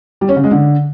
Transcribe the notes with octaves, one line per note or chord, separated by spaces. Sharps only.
G3
C#4
C#3
G#3
D3